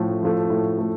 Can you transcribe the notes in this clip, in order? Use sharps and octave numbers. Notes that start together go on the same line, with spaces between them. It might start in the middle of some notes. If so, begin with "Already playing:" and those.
Already playing: A2 F3 A3
F3 A3
A2
A3